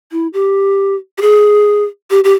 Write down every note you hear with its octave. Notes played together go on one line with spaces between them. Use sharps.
E4
G4
G4
G#4
G4
G4